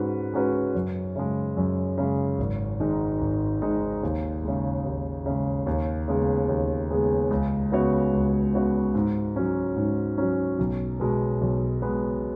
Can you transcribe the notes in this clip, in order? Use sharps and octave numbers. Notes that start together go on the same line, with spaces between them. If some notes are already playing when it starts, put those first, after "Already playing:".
Already playing: G#2 G#3 C#4 F#4 B4
G#3 C#4 F#4 B4
F#2
C#3 G#3
F#2
C#3 G#3
G#1
G#2 D#3 G#3 D#4
G#1
G#2 D#3 G#3 D#4
D#2
C#3 G#3
D#2
C#3 G#3
D#2
C#3 G#3 B3 G#4
D#2
C#3 G#3 B3 G#4
C#2
C#3 B3 F#4 C#5
C#2
C#3 B3 F#4 C#5
G#2
F#3 C#4
G#2
F#3 C#4
B1
B2 G#3 B3
B1
B2 G#3 B3